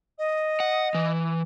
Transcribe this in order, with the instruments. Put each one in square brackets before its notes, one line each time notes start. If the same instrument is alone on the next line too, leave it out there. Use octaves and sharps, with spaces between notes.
[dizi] D#5
[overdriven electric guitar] F#5
E3